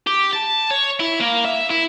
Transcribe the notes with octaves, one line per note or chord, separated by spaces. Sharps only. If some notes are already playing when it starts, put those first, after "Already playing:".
G4
A5
C#5
E4
A#3
E5
E4